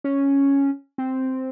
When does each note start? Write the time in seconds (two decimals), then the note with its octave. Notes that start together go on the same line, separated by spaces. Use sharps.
0.04 C#4
0.98 C4